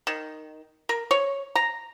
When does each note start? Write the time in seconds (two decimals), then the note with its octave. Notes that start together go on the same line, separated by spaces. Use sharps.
0.07 D#3
0.89 A#4
1.11 C#5
1.55 A#5